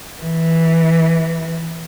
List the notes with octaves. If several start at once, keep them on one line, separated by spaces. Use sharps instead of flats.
E3